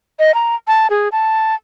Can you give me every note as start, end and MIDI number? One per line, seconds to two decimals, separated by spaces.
0.19 0.34 75
0.34 0.55 82
0.67 0.87 81
0.90 1.08 68
1.12 1.55 81